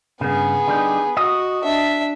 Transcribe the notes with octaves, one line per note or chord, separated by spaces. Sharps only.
G2 C#3 B3 G#4
D3 G3 D#4
F#4 D#5
D4 E5